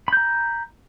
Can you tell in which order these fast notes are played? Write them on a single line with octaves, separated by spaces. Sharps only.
B5 G6 A#5